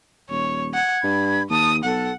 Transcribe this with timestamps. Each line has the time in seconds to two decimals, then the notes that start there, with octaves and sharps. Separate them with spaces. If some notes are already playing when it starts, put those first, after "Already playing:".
0.30 D#1 C#5
0.74 F#5 G#6
1.04 G2 B5
1.50 D#2 A5 D#6
1.84 B1 A4 F#5